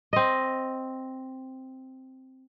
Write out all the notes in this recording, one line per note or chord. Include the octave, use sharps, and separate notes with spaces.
C4 D#5